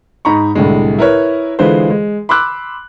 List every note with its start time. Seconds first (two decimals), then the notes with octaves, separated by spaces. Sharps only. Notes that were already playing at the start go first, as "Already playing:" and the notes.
0.25 G#2 D#4 A#5 B5 C#6
0.55 C2 A2 D3 G#3
0.99 E4 A#4 B4 C#5
1.59 D3 E3 G#3 F4 B4 C5
1.90 G#3
2.29 B5 C6 D6 E6 F#6